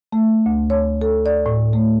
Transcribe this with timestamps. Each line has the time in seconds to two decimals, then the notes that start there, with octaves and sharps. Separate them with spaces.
0.12 A3
0.46 D2
0.70 C#5
1.01 A4
1.26 D5
1.46 A2
1.73 A3